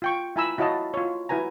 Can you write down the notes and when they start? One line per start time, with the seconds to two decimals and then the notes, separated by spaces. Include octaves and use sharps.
0.02 F4 G5 C#6
0.36 E4 F4 G#5 A#5 B5 E6
0.58 E4 F#4 C#5 D#5 F5 A5
0.94 F4 C#5
1.29 E4 F#4 B4 G#5 A#5